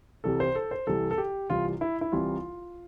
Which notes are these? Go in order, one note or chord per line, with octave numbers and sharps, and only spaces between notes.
C2 C3 E3 G3 A4
C5
A4
C5
C2 C3 E3 G3 A4
A4
G4
C2 C3 E3 G3 F4
E4
E4
C2 C3 E3 G3 F4